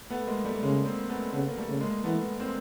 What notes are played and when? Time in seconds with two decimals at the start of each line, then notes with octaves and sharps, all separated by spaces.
0.10 A3 B3
0.27 G#3 A#3
0.45 G3 A3
0.63 C#3 G#3 A#3
0.86 A#3 C4
1.09 A3 B3
1.33 C#3 A3 B3
1.49 A#3
1.57 G3 A3
1.69 C#3
1.81 G#3 A#3
2.04 E3 A3 B3
2.40 A#3 C4